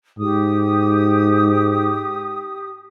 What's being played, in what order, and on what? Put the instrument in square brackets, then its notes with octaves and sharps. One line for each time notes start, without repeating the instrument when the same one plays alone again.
[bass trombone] G#2 [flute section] G4 D#6